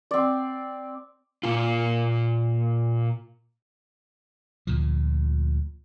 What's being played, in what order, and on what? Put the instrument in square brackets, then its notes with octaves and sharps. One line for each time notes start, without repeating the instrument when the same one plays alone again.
[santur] C4 D5
[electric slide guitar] A#2 F4
[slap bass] D2 A#2 F3